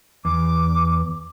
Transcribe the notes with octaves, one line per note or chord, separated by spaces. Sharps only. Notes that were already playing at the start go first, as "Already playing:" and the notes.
E2 D6